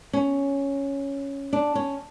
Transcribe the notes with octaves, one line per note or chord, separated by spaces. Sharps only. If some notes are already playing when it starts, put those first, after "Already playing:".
C#4
D4
C#4